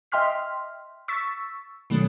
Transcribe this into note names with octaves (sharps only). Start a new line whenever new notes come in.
D#5 E5 G5 C6 F6 B6
C#6 E6 A6 B6
B2 D#3 F#3 A3 C#4